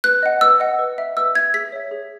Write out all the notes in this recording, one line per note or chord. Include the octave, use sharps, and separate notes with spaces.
B4 F#6
D#5 F#5
B4 E6
D#5 F#5
B4
E5
B4 E6
E5 G#6
G#4 B6
C#5 E5
G#4